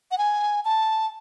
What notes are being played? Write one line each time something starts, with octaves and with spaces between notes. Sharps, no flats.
F#5
G#5
A5